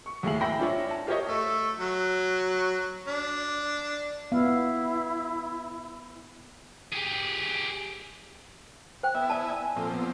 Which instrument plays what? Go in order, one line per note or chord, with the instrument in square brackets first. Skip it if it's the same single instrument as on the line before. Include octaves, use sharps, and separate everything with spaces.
[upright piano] C#6
D#2 A2 E4 G#4 F5 F#7
E5 G5 B5 A#6
D4 F4 C#5 E5
A5
F4 G4 A#4 C#5 D#5
[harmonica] A3
F#3
D4
[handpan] B3 F5 [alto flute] E4
[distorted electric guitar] G4 G#4
[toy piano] C5 G5
[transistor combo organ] B3 E4 E5
[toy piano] D5 A5 [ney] G#5
[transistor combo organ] A#2 F3 C4 [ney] A4
[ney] B3